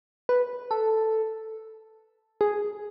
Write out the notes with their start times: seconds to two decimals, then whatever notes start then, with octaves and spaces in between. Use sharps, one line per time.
0.29 B4
0.71 A4
2.41 G#4